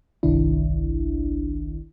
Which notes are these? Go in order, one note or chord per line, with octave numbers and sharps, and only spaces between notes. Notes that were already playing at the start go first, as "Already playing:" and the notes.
G1 C2 D#3 D4 E4